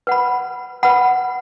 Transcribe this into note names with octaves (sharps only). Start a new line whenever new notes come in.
B4 F#5 B5
B4 F#5 B5